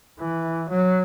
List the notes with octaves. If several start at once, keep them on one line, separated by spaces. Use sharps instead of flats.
E3
F#3